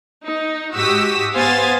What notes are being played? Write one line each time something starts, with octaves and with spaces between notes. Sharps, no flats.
D#4
G#2 F#4 G4 D#6 E6 B6
B3 C5 F5 G#5 D#6 A6